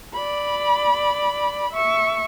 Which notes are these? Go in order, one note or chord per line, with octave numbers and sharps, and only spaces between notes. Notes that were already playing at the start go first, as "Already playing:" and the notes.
D5 B5
E5 C#6